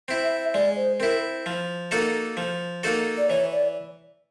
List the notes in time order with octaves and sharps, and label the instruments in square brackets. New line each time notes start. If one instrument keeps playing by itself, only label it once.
[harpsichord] C4 E4
[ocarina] E5
[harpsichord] G#3 [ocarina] D5
[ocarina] C5
[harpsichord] C4 E4 [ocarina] A#4
[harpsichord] F3
A#3 D#4 F#4 A4
F3
A#3 D#4 F#4 A4
[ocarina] D5
[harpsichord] E3 [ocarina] C#5
[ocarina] D5